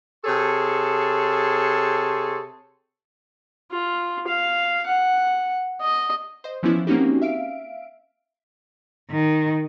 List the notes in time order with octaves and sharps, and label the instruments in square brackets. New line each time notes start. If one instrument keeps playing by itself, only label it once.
[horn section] C3 G#4 A4 C#5 A5 C6
[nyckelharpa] F4
F5
F#5
D#5
[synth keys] C5 D#5
E3 F3 B3 C#4 E4
A#3 C4 C#4 D#4 F#4 G4
E5 F5 D7
[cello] D#3